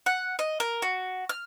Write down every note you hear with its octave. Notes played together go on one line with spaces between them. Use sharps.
F#5
D#5
A#4
F#4
F6